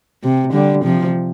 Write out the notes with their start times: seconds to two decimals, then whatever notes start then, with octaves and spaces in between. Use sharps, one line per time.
0.23 C3
0.53 D3 G3
0.84 C3 F3